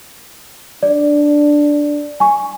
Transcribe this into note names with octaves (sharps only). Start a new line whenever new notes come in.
D4 D5
G#5 C#6